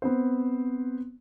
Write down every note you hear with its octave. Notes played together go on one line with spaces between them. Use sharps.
B3 C4 C5